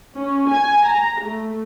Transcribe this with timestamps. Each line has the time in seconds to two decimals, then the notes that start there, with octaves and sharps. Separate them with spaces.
0.15 C#4
0.49 G#5
0.86 A#5
1.23 A3